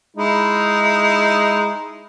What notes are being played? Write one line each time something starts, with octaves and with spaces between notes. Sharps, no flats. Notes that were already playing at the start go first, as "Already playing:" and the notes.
G#3 D#4 E4